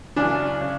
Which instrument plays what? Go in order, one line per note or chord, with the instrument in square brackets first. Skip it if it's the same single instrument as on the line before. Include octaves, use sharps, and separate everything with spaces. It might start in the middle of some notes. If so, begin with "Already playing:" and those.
[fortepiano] F#2 C#3 E3 D4
C#3